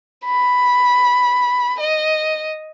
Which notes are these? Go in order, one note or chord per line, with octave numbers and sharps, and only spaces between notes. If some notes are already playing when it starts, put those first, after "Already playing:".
B5
D#5